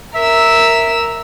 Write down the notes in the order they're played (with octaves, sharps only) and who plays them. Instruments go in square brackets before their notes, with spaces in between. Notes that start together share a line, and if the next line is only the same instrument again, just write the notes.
[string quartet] A#4 E6 [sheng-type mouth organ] E5